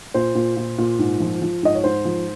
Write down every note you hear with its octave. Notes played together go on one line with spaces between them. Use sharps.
A#2 C5
A#2
A#2
A#2
G#2
F3
F3
G#2 D#5
C#5
G#2 C5
F3